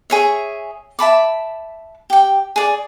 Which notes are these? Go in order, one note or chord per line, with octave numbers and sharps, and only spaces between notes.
G#4 C#5 E5
E5 A5 B5 D6
G4 G5
G#4 D5